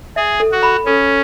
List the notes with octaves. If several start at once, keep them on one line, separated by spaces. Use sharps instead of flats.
G#4 E5
A4
F#4
B5
C#4 A4